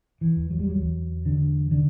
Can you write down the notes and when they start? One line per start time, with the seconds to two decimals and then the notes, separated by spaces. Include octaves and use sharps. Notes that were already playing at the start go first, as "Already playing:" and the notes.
0.21 E3
0.36 E2
0.51 F#3
0.60 G3
0.69 F#3
0.82 E2
1.26 D3
1.71 D3